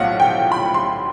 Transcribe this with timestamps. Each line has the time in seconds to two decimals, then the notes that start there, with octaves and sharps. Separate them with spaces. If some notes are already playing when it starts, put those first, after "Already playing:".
Already playing: B1 A2 F3 F5 F#5
0.20 G5
0.52 B5
0.74 C6